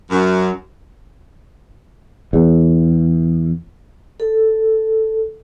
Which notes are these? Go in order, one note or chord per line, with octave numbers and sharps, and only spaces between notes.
F#2
E2
A4